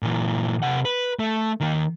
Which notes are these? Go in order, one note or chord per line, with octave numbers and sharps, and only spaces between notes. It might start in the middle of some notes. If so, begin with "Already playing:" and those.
A#2 E3
C3 F#5
B4
A3
D#3 A#3